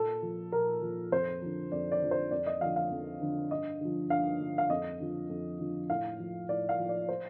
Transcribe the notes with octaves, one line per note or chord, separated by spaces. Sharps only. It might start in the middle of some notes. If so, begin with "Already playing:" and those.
Already playing: A#2 A4
F3
A#2 A#4
F3
F2 C5
D3 F3
F2 D5
D5
D3 F3
C5
F2 D5
D#5
D3 F3 F5
F5
F2
D3 F3
G2 D#5
D3 F3
G2 F5
D3 F3
F5
F2 D#5
D3 F3
F2
D3 F3
A2 F5
F3
A2 D5
F5
F3
D5
C5